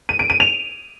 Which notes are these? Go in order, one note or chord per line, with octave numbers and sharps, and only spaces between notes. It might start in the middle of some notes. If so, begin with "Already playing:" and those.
D#7
D7
D#7
F7